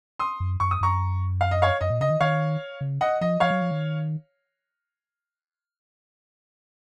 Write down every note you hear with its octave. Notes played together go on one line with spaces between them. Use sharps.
C6 D#6
F#2
F#2 C#6
D#6
F#2 A#5 C#6
F5
D#5
C#5 F5
F#2 D#5
A#2
C#3 D#5
D#3
D#3 C#5 F5
C#3
D#5 F#5
F3 D#5
F3 C#5 F5
F#3
F3
D#3